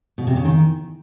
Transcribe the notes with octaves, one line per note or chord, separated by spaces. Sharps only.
B2
C3
C#3
D#3